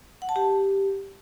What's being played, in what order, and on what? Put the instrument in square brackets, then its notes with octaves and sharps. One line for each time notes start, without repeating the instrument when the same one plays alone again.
[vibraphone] F#5
A5
G4